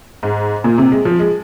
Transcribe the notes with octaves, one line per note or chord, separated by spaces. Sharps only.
G#2
A#2
C3
G#3
F3
G#3